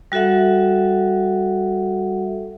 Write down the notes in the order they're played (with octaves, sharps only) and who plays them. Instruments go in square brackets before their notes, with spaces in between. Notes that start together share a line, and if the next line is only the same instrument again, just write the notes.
[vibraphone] G3 F#4 A4 E5 F#5